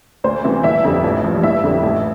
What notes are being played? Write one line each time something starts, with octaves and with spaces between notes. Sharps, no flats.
D2 C5
C3 E3 G3
G1 E4 E5
F2 D3 G3
A1
G2 F3
G1 E4 E5
F2 D3 G3
A1